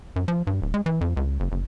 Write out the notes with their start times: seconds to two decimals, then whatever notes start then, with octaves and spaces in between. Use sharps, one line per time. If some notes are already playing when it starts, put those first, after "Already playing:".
0.16 F#2
0.28 F3
0.47 G2
0.62 D1
0.74 G#3
0.86 E3
1.01 F2
1.17 C#2
1.40 F#1
1.52 F#1